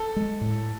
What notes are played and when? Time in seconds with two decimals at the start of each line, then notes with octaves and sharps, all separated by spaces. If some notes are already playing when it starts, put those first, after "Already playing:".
Already playing: A4
0.16 G#3
0.41 A2